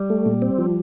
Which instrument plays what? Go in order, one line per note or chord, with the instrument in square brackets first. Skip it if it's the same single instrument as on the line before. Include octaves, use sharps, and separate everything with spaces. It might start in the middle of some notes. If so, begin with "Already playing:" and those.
Already playing: [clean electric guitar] G3
[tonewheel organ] A3
A#2
C4
F3